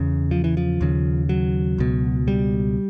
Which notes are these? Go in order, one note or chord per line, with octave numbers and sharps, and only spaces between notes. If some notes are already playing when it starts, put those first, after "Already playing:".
Already playing: E2 C#3
F3
E3
F3
D#2 C#3
F#3
C#2 B2
G3